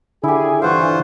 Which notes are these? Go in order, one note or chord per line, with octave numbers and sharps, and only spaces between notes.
D3 E4 G4 G#4 G#5
G2 E3 F4 C5 F5 F#5 C#6